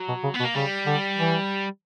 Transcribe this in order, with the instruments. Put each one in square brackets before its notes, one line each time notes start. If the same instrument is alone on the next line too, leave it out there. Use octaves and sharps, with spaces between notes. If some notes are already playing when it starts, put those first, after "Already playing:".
Already playing: [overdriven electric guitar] F#3
[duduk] B2
C#3
[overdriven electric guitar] B3
[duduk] B2
[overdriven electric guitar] A#3
[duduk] C#3 [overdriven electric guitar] G3
[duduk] D3
E3